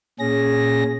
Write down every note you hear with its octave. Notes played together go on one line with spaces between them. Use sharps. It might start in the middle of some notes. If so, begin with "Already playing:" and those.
A#2 C#4 G#4 A#6